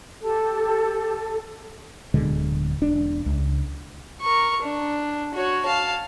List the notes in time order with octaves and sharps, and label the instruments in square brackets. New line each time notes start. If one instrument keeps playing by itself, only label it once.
[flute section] G4 A4
[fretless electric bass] D1 B2 D3 G#3
E1 D4
C#2
[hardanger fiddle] A#4 C#6
D4
F#4 C#5
F5 A5